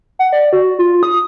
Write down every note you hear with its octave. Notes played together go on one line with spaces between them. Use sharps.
F#5
D5
F#4
F4
D#6